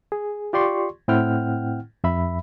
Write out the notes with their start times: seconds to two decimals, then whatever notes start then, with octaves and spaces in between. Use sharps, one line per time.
0.12 G#4
0.53 F4 G4 D5 C6 C#6
1.08 A2 C4 E4 F#5 G5 F6
2.04 F2 E5 B5